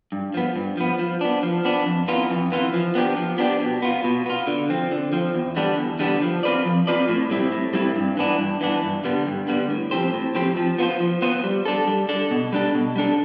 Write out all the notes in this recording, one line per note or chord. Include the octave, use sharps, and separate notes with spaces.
G2
F3 B3
G2
F3 B3
F3
B3 D4
F3
B3 D4
F2
E3 B3 F4
F2
E3 B3 F4
F3
B3 D4 G4
F3
B3 D4 G4
B2
B3 F4
B2
B3 F4
D3
F3 C4
D3
F3 C4
E2
D3 G3 B3 D4
E2
D3 G3 B3 D4
F3
C4 F4 B4 D5
F3
C4 F4 B4 D5
A2
G3 C4 E4
A2
G3 C4 E4
G2
E3 B3 D4
G2
E3 B3 D4
G2
D3 G3 B3
G2
D3 G3 B3
A2
F3 C4 G4 C5
A2
F3 C4 G4 C5
F3
B3 F4 C5
F3
B3 F4 C5
G3
D4 A4
G3
D4 A4
B2
G3 D4 A4
B2
G3 D4 A4